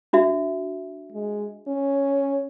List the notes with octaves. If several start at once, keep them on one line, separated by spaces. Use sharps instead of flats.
D4 F#4 E5
G#3
C#4